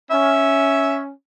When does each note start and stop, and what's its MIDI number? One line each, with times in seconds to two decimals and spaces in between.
0.10 1.11 61
0.10 0.99 76